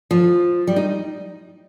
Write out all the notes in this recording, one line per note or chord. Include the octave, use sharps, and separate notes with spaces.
F3
G3
D#4